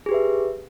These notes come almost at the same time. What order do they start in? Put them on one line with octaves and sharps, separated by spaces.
G#4 G4 B4 E5